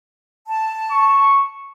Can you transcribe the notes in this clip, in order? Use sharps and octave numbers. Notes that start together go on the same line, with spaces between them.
A5
C#6